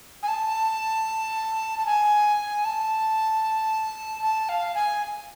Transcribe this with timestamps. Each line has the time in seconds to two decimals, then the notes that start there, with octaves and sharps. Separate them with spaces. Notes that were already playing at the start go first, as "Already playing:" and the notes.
0.23 G#5
0.28 A5
1.79 A5
1.86 G#5
2.65 A5
4.22 A5
4.49 F5
4.75 G#5